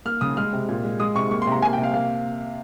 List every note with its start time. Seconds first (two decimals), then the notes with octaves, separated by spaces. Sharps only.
0.05 A#3 F6
0.21 C#3 D#6
0.37 G#3 F6
0.53 C3
0.68 A#2
0.84 G#3
1.00 G#3 D#6
1.15 C3 C#6
1.31 A#3 C#6
1.42 C6
1.47 C3 A#5
1.62 A#3 G#5
1.73 G5
1.78 C3
1.83 F5
1.94 A#3 F5